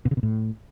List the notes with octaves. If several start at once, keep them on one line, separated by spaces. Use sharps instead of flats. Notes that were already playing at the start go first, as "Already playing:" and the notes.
B2
C#3
B2
A2